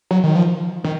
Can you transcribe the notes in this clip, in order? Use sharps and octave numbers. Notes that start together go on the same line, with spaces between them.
F#3
D#3
F3
D#3